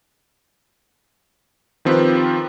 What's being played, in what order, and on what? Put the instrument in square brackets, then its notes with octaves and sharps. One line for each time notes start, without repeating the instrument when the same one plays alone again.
[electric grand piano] D#3 F3 C4 F4 G4 B4